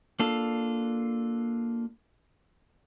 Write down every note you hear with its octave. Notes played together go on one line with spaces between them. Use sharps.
A#3 D4 F4 A4